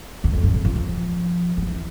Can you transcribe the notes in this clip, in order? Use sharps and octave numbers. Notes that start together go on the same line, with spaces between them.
E2
F2
G2
A#2
F3
F3
F3
E3